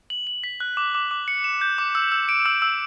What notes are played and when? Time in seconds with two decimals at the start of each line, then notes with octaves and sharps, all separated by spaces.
0.10 F#7
0.27 F#7
0.44 B6
0.60 F#6
0.77 D6
0.95 D6
1.11 D6
1.28 C#7
1.44 E7
1.61 G6
1.78 D6
1.95 E6
2.12 E6
2.29 D7
2.46 E6
2.62 E6